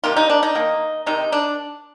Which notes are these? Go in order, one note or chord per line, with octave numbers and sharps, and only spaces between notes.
C3 D#3 A#3 F4
D#4
D4
D#4
D#3 A#3
C3 D#3 G#3 D#4
D4